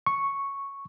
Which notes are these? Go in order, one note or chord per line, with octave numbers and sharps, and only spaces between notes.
C#6